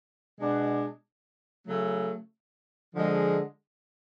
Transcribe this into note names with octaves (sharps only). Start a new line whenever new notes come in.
B2 G#3 D4
C#3 F#3 A3
D3 F3 G#3